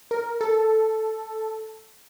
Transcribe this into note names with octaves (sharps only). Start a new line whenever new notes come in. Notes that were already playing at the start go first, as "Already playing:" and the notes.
A#4
A4